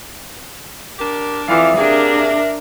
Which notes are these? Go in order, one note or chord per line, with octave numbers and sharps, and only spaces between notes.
D4 G4 A#4
F2 E3 D5 E5 F5 D6 D#6
C3 A#3 D4 G#4 A#4
E5